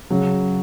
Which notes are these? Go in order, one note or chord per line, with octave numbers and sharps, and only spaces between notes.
C#3 F#3